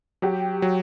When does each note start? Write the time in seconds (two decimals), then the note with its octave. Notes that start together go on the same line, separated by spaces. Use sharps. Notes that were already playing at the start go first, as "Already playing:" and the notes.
0.22 F#3 G4
0.62 F#3